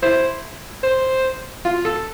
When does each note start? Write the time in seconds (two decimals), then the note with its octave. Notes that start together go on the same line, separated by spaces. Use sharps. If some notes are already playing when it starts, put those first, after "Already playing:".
0.03 E4 C5
0.83 C5
1.65 F4
1.85 A4